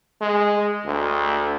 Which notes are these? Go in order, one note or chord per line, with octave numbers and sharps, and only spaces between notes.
G#3
D2